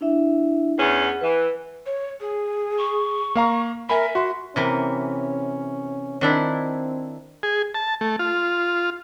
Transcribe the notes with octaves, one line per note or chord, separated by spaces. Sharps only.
D4 E4 E5
E2 C#4
F#5
E3 B4
C#5
G#4
C#6
A#3 F5 A#5
A#4 E5 G#5 B5
F#4 C6
C3 E3 A#3 C#4
D#3 C4 D4 E4
G#4
A5
A3
F4